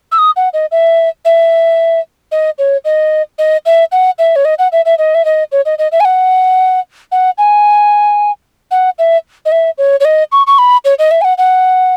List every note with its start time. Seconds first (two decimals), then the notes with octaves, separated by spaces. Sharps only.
0.12 E6
0.18 D#6
0.37 F#5
0.54 D#5
0.72 E5
1.25 E5
2.32 D#5
2.59 C#5
2.85 D#5
3.39 D#5
3.66 E5
3.92 F#5
4.19 E5
4.36 C#5
4.45 D#5
4.59 F#5
4.72 E5
4.85 E5
4.98 D#5
5.15 E5
5.25 D#5
5.52 C#5
5.66 D#5
5.79 D#5
5.92 E5
6.00 G#5
6.05 F#5
7.12 F#5
7.38 G#5
8.71 F#5
8.99 E5
9.46 D#5
9.52 E5
9.78 C#5
10.00 C#5
10.05 D#5
10.32 C#6
10.47 C#6
10.58 B5
10.85 C#5
10.99 D#5
11.11 E5
11.21 G#5
11.24 F#5
11.38 F#5